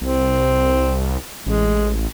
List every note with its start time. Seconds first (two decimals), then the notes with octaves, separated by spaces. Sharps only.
0.01 C2 C4
1.46 A1 G#3